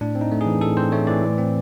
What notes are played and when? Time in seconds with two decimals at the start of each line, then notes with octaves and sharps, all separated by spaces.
0.01 A2 D4
0.15 C4
0.21 D#4
0.32 A3
0.41 G#4
0.46 E3
0.61 A2 A4
0.77 C4 C5
0.92 A3 C#5
1.07 E3 D5
1.23 A2
1.38 C4